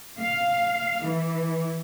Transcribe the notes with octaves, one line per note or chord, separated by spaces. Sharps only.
F5
E3